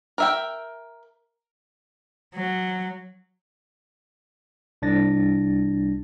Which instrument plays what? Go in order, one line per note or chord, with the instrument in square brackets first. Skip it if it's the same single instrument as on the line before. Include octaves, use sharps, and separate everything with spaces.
[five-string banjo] A#4 E5 G5
[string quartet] F#3
[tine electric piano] C2 D4 A6 A#6